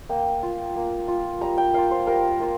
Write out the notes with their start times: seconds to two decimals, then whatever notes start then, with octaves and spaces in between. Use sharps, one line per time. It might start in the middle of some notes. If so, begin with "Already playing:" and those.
0.09 A#3 G5
0.43 F4
0.76 A#3
1.08 F4
1.41 G3 A#5
1.58 G5
1.73 A#3 F4 F5
1.91 C5
2.07 G3 A#4
2.40 A#3 F4